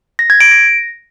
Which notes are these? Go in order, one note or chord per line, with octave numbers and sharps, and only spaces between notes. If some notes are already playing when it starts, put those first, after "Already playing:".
A#6
G#6
D7
A#6